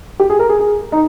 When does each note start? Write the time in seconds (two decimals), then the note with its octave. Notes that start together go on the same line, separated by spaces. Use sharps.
0.20 G4
0.30 G#4
0.39 A#4
0.49 G#4
0.60 G#4
0.92 D#4